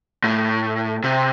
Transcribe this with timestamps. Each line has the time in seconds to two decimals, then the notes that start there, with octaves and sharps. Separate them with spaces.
0.24 A2
1.04 C3